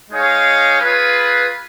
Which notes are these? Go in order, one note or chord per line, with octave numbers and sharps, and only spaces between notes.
G#3 D#4 G#4 C#5 F5
F4 G#4 B4